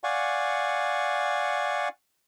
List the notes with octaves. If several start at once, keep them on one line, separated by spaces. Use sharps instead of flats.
D5 F5 F#5 G#5 C#6